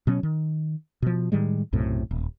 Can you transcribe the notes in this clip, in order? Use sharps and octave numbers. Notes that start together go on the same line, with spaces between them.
B2 F#3 C#4
D#3
B2 F3
A2 D#3 G3 G#3
B1 F#2 A2 C3
D#1